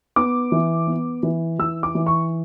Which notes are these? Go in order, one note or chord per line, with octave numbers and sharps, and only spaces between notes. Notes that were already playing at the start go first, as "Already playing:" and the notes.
B3 D6
E3
B3
E3
E3 E6
D6
E3
C#6